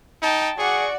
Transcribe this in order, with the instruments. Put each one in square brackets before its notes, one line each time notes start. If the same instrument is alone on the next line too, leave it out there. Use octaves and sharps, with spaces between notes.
[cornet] D#4 [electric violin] G5 A5
[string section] F#4 D5 [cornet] G#4 [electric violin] F#5 C#6